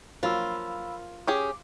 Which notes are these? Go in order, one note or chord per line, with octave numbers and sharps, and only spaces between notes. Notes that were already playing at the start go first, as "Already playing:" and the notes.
F3 F#3 A#3 F4 F5 B5 E6
C#4 G4 G#4 D6